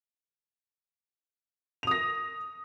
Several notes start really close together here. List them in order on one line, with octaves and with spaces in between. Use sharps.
F7 D#6 A#6